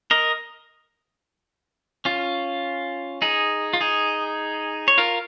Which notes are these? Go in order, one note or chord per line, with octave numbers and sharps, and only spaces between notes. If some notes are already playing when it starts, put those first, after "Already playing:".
A#4 D#5
C#4 F4
D#4 G#4
F4
D#4 G#4
C#5
F4 A#4